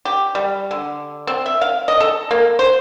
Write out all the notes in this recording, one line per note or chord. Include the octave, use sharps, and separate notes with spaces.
G4
G3
D3
C4
E5
F5
D#5
A4
A#3
C5